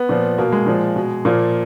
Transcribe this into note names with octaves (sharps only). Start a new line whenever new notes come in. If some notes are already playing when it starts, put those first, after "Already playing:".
Already playing: B3
A#2 F3
B2 A#3
G#3
A#2 F3
B2
A#2 F3 A#3